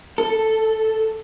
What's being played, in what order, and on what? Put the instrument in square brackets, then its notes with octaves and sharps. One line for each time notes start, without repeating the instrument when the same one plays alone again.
[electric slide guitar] A4